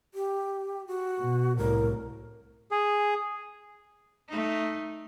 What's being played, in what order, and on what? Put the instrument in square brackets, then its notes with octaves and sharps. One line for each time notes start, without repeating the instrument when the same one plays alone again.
[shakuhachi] G4
F#4
[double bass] B2
[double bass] C2 A2 [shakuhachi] A#4
[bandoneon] G#4
[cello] A3 D#4